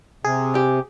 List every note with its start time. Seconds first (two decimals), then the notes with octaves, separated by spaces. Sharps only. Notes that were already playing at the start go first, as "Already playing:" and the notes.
0.25 C3 G#4
0.55 G4